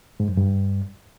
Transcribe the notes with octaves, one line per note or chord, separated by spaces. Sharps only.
G#2
F#2
G2